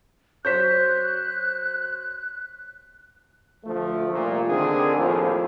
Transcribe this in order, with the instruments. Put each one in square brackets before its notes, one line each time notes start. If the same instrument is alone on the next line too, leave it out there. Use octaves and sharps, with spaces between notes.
[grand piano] F#3 C5 C#5 [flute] F#6 [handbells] G6 B6
[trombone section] D2 F3 A3
C2 A#2
D3 D#3 C4 D4 G#4
D#2 A2 F3